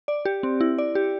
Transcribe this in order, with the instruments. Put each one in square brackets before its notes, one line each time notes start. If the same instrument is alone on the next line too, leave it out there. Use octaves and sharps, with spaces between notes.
[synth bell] D5
G4
C4
E4
D5
G4